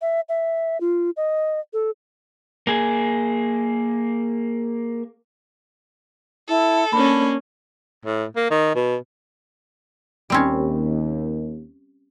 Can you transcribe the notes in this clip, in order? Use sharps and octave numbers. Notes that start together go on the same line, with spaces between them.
E5
E5
F4
D#5
A4
A#3 G#4
E4 A4
A#3 C#4 D4 B5
A2
A#3
D#3
B2
D#2 G3 C4 C#4